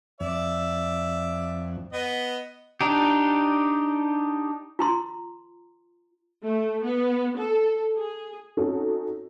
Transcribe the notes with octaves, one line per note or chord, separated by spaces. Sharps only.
F2 D5 E5
B3 D#5
D4 D#4 G4
F4 A#5 C6
A3
B3
A4
G#4
C4 C#4 D#4 F#4 A4